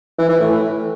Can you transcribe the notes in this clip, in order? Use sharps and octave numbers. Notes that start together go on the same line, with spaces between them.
E3
E3
A2